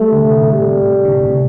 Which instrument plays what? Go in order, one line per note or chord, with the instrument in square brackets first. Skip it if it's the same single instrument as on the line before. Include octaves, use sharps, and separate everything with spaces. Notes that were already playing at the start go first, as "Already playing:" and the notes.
Already playing: [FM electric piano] G3 [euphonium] A3
[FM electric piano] D3
C3
A2
[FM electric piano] C3 [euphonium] G3
[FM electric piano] C3
A2
D3
C3
A2
C3